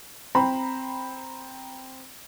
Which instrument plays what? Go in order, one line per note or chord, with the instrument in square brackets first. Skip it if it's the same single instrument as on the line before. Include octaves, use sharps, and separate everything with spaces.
[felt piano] C4 A#5 B5